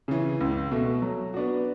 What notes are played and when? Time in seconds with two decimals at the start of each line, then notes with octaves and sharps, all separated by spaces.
0.08 C#3 E3
0.40 C#2
0.72 B2 A3
1.02 F#3
1.34 B3 D4 F#4